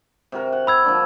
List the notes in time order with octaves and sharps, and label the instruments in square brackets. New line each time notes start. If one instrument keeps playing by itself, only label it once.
[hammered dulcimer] C3 F#4 A#4
F#5
[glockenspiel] B5 E6 G#6
[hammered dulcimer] F3 A#3 D4